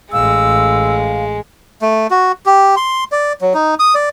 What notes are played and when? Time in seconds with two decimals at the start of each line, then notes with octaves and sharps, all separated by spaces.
0.12 A1 G#3 F5 E6
1.82 A3
2.11 F#4
2.46 G4
2.76 C6
3.12 D5
3.41 F#3
3.54 D#4
3.79 D#6
3.95 D5